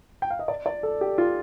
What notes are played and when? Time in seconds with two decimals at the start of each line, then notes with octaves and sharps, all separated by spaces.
0.22 G5
0.30 F5
0.39 D#5
0.48 D5
0.66 D5
0.83 A4
1.01 G4
1.18 F4